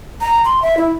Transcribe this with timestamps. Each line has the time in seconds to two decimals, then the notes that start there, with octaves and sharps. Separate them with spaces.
0.21 A#5
0.45 C6
0.63 E5
0.77 E4